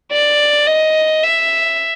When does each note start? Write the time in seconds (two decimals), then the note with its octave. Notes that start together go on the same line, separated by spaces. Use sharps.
0.12 D5
0.67 D#5
1.23 E5